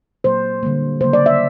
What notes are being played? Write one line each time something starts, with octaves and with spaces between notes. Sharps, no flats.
A#2 F#3 A#3 C5
D3 G3 A#3
C#3 F#3 A#3 C5
D5
E5